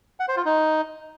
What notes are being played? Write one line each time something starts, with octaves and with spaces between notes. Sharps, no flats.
F#5
C5
F4
D#4